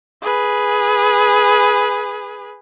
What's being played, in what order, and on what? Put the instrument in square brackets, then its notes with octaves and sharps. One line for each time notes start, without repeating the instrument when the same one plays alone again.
[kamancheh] G#4 B4